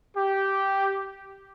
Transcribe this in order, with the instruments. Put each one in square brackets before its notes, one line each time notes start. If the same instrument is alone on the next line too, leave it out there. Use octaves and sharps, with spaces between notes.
[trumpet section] G4